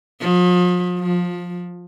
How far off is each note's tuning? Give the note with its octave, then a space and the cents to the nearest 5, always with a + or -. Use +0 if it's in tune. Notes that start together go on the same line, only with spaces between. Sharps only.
F3 +40
F3 +15